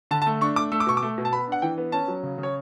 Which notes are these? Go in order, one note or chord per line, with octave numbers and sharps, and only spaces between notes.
D3 A5
A5
A3
D4 C#6
A3 D6
A3 E6
D6
B2 C#6
D6
A3
B2
A5
B3 B5
D4 F#5
E3 G5
B3
C#4 A5
F#3
C#3
C#3
C#5